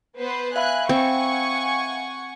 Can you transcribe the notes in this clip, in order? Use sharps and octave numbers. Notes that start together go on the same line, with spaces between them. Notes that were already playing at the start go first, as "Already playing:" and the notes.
B3 B4 C5
E5 F5 G#5 B5 F#6
C4 F#5 G#5 C#6